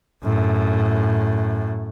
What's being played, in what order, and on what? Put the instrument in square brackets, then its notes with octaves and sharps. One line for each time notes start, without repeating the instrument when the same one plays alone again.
[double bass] F#2 A2